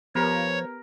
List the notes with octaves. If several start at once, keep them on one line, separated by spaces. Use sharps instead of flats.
F3 B3 G4 A#4 B4 C#5